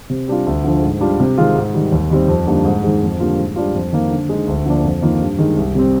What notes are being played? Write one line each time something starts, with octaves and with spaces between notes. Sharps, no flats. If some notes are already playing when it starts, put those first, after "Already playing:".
C3
G3 D4 F4
D2
D3 F3
G#2
G3 D4 F4
C3
D#3 G#3 C4 F4
G#2
D#3 G3
D#2
D#3 G3 C4
F2
D3 G3 A#3 D#4
G#2
D#3 G#3
F2
D3 G3 A#3 F4
G#2
G3 D4 F4
F2
D#3 A#3
D3
G#3 D#4
D2
D3 F3 A#3 D4
F2
D#3 A#3 F4
G2
D#3 G#3
C2
C3 G3 C4